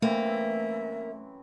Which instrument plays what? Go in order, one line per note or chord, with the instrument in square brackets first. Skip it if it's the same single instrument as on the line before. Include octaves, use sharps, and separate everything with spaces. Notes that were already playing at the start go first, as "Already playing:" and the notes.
[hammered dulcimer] F#2 E3 C4 [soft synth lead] A3 [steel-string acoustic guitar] A#3 [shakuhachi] E5